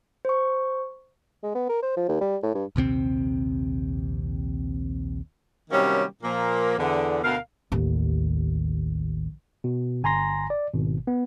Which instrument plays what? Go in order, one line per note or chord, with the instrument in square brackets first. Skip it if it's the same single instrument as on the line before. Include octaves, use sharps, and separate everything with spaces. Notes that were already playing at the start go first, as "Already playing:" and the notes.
[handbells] C5 C#6
[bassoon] G#3
B3
A#4
C5
F3
D#2
G3
A2
G2
[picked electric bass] A#1 D#2 C3 C4
[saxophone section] C3 D#3 F#3 G3 A#3 C#4
A#2 F3 A#3
E2 D3
D2 B2 A#4 F5
[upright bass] A1 D#2
[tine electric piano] B2
G1 G#5 A#5 C6 A#6
D5
G#1 B2
B3